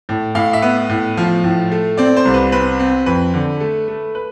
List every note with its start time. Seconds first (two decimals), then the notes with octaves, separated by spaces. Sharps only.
0.09 A2
0.35 A2 F5
0.53 E5
0.62 B3
0.89 A2
1.17 F3
1.44 A2
1.71 A3
1.97 C4 D5
2.16 C5
2.25 C2
2.34 B4
2.52 C4 B4
2.79 C4
3.06 F2 B4
3.34 D3
3.60 A3
3.88 A3
4.15 B4